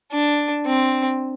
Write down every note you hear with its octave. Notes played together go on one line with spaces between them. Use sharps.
D4
C4